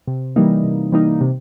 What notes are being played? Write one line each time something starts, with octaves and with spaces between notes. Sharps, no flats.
C3
E3 G3 A#3 D#4
C3
E3 G3 A#3 D#4
C3